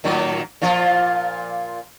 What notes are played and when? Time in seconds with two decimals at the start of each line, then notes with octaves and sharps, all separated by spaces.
0.04 A2 D#3 F#3
0.62 A#2 F3 F4